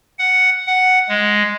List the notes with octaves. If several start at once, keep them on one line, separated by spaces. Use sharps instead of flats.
F#5
F#5
G#3